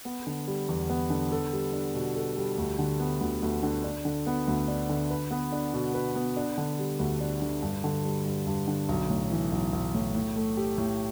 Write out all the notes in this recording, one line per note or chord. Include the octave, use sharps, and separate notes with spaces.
B3
D3
G3
E2
B3
D3
A4
G3
D4
B2
A4
G3
D2
D3
B3
D2
D2
D3
D4
D3
B3
D2
D4
D3
B4
B3
D4
B2
B4
B3
D4
D3
G3
D2
D4
D3
G2
D3
G3
G2
G2
D3
B1
A2
E3
B1
B1
A2
A2
A3
G4
A2